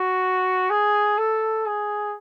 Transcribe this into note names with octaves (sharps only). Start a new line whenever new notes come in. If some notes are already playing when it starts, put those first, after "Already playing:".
Already playing: F#4
G#4
A4
G#4